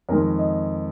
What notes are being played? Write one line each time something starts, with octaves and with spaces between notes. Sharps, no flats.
F2 D#3 G#3 A#4
D#5